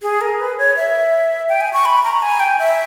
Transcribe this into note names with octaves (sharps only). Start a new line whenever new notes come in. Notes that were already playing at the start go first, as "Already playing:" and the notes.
G#4
A#4
B4
C#5
E5
G5
G#5
C#6
B5
A#5
G#5
G5
E5